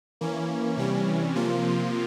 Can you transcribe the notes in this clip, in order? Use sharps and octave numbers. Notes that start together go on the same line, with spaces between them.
E3 A#3 C#4
C3 E3 G3 C#4
C3 F3 A#3 F4